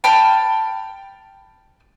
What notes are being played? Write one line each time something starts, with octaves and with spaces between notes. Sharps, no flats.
G5 A5 B5 F6